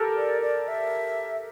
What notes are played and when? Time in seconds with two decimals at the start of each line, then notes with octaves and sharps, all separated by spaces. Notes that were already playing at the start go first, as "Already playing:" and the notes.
Already playing: G4 A4 A#4
0.17 D5
0.42 D5
0.68 E5